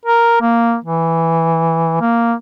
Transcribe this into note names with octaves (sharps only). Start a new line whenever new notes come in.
A#4
A#3
E3
A#3